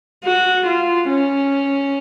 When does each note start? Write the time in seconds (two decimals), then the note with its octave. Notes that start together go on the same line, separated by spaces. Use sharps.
0.24 F#4
0.67 F4
1.10 C#4